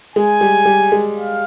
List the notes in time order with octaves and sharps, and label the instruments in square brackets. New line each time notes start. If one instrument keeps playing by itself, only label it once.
[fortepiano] G#3 [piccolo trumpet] G#5
[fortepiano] G3
G3
G#3
[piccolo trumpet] F5